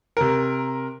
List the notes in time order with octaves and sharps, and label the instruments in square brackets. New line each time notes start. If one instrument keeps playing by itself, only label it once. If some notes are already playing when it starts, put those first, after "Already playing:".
[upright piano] C3 A#4